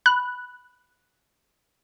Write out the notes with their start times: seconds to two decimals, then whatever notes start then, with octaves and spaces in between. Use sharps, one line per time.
0.06 B5 F#6